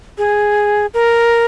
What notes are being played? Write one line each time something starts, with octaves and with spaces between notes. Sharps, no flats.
G#4
A#4